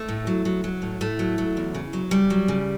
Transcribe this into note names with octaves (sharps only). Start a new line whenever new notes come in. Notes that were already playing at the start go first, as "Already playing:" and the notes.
Already playing: A3
A2
F#3
F#3
F#3
A2
A2 A3
F#3
F#3
E2
C#3
F#3
C#3 G3
F#3
C#3